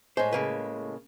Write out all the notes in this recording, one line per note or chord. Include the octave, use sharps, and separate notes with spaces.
A2 G#3 C5
C#3 A#3 B4